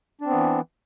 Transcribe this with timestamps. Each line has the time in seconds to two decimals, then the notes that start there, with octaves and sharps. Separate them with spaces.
0.21 D4
0.26 C4
0.30 B3
0.34 E3